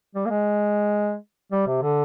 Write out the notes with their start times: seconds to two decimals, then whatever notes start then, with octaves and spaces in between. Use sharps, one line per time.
0.15 G3
0.25 A#3
0.30 G#3
1.51 G3
1.67 C3
1.82 D3